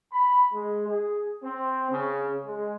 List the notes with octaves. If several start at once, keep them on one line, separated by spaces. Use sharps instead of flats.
B5
G#3
G#4
C4
C#3
G#3